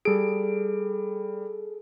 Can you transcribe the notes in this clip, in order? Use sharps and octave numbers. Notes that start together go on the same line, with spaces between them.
G3 G#4 A4 D7